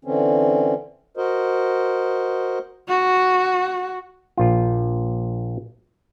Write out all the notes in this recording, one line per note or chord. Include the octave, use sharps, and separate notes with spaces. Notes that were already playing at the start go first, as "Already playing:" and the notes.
D3 E3 C4 C#4
F#4 A#4 C5 D#5
F#4
A#1 F4